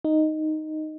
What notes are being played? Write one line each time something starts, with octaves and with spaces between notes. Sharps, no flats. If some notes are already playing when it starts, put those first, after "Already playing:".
D#4